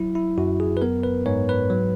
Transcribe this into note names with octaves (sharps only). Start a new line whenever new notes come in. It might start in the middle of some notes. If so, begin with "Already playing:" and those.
Already playing: F#3 E4
E4
F#2 F#4
G#4
B4
B3 A#4
B4
G#2 C#5
B4
F#3